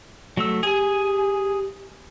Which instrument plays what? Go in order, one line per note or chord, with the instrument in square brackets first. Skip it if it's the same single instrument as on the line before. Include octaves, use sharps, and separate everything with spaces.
[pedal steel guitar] F#3 A3 E6
[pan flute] G4 [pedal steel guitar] G#4 G#5